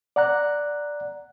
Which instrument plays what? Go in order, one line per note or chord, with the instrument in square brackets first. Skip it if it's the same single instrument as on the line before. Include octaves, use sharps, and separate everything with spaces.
[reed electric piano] D5 F#5 A#5 F#6